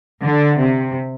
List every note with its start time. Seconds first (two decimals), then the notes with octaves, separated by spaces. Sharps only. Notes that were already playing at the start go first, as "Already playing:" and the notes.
0.22 D3
0.60 C3